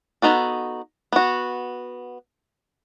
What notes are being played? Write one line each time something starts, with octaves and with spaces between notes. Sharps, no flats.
B3 D#4 F#4 A4
B3 F#4